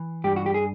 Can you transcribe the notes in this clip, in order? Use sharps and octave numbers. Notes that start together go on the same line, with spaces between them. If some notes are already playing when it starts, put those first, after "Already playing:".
Already playing: E3
G2 G4
F#4
G4
G#4